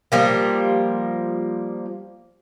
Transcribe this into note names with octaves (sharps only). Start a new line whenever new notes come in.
F3 G3 A#3